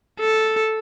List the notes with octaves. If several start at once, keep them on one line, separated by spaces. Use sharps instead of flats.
A4